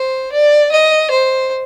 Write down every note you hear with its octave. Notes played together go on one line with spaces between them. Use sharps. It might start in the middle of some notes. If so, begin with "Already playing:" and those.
Already playing: C5
D5
D#5
C5